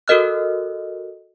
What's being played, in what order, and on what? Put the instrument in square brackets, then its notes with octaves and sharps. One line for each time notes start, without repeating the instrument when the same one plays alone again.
[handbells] F#4 A4 A#4 D#5 F6 F#6